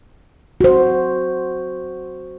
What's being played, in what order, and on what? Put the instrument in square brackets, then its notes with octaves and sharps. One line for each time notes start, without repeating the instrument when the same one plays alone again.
[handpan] F#4 C5